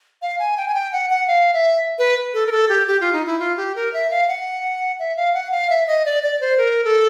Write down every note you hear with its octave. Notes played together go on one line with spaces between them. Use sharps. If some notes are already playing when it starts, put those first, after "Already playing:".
F5
G#5
G5
G#5
G5
F#5
F#5
F5
E5
B4
A4
A#4
A4
G4
G4
F4
D#4
E4
F4
G4
A#4
E5
F5
F#5
E5
F5
F#5
F5
E5
D#5
D5
D5
C5
A#4
A4